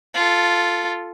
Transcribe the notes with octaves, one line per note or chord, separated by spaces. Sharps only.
F4 A4